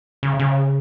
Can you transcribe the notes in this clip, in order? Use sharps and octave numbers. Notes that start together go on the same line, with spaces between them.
C#3
C#3